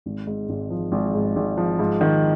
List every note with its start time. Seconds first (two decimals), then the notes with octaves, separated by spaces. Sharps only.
0.06 G#1
0.27 G#2
0.49 G#1
0.70 F3
0.92 G#1
1.14 G#2
1.36 G#1
1.57 F3
1.79 G#2
2.01 D#3